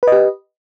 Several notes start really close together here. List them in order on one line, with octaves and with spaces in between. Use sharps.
B4 D#5 G4